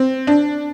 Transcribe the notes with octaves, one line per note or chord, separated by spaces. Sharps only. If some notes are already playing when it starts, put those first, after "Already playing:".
Already playing: C4
D4